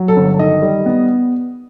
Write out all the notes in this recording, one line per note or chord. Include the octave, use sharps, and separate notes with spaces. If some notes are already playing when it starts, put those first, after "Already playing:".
Already playing: F#3
A4
G1
D#3 D#5
G3
B3